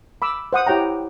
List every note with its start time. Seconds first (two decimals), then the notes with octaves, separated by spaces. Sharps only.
0.22 B5 D6 E6
0.53 C5 F#5 D#6
0.67 E4 G4 C#5 G5 A#5